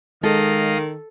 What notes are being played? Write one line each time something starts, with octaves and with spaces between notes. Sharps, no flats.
D#3 G#3 A4 D#5 F5